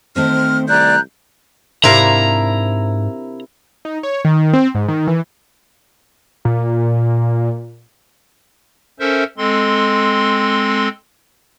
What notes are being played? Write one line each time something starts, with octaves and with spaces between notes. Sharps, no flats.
D#3 A3 C4 C5 F6
C2 D5 A#5 F#6 G6
G#2 C3 D4 E4 A#4 C5 F5 A#5
D#4
C#5
D#3
C4
G#2
D#3
E3
A#2
C#4 A4 A#4 C5 E5
G#3 C4 A4 C6